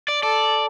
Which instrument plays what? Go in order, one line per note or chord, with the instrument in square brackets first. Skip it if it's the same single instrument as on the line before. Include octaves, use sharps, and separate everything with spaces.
[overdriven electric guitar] D5
[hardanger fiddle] A4 [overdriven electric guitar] D5